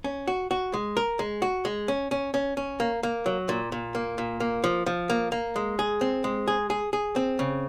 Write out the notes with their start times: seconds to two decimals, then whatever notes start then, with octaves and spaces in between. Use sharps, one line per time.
0.04 C#4
0.28 F#4
0.51 F#4
0.73 G#3
0.97 A#4
1.19 G#3
1.42 F#4
1.65 G#3
1.88 C#4
2.11 C#4
2.34 C#4
2.57 C#4
2.80 A#3
3.03 A#3
3.26 F#3
3.49 A#2
3.72 A#2
3.95 A#3
4.18 A#2
4.40 A#3
4.64 F3
4.86 F3
5.10 A#3
5.32 A#3
5.56 G#3
5.79 G#4
6.01 C4
6.24 G#3
6.47 G#4
6.70 G#4
6.93 G#4
7.16 C4
7.39 C#3